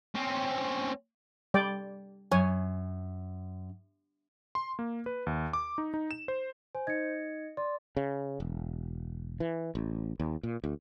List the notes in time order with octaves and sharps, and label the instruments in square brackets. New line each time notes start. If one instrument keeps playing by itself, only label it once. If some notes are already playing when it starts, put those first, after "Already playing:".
[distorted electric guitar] C4 C#4
[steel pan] G3 D5 G5
[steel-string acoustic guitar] F#2 [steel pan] C#5 G#5
[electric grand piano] C6
A#3
B4
D#2
D6
D#4
D#4
E7
C5
[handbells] C5 [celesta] G#5
[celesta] D#4 G#6 [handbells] D#5 C#7
[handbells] D5 [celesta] C6
[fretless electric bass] C#3
E1
E3
A1
D#2
A#2
D2